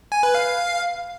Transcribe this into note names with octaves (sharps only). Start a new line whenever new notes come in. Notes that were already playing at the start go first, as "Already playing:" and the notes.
G#5
B4
F5